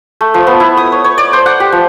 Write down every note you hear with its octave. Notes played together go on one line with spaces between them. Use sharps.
A3
F3
B3
E4
D#6
C#5
C#5
D5
C5
F#5
G4
F3